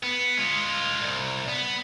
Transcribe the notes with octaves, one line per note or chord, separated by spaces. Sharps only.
B3
G#3 F4
C2
B3